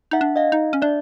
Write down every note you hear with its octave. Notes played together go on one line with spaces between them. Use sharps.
D#4 E5 F#5
D4
D#5 F5
D#4
C#4
D4 D5 E5